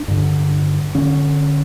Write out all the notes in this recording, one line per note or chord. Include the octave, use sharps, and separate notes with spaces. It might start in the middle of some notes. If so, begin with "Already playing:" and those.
Already playing: D4
G2 D3
D3 C#4